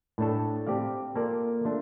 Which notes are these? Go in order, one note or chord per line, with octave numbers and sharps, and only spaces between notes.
A2 A3 D4 A4
C4 G4 D5 F5
A#3 F4 A4 D5 F5
A3 D4 F4